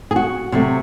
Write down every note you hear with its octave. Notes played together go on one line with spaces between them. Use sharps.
G#4
F#4
C3 F#3 A3